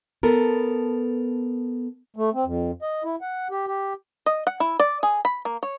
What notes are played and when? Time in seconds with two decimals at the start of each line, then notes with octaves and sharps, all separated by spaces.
0.23 B3 A4 A#4
2.16 A3
2.34 C4
2.45 F2
2.82 D#5
3.04 E4
3.21 F#5
3.51 G4
3.67 G4
4.26 D#5
4.47 F#5
4.60 E4
4.80 D5
5.03 G#4
5.25 B5
5.45 A#3
5.63 C#5